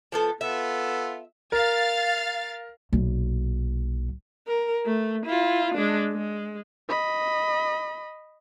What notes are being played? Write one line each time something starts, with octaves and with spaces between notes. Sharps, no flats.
F3 B3 A4
B3 F4 A4 E5
A#4 F5 A6
B1 A#2
A#4
A3
E4 F4
G#3 D4
G#3
D#5 B5